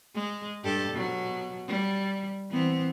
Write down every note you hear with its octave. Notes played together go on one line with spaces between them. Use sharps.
G#3
G2 G4 A4
B2 F#3
G3
E3 B3 C4